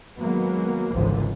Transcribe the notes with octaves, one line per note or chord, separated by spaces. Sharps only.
D#3 F#3 G#3 A#3 B3
G#1 C#2 G#2 D3 E3 F3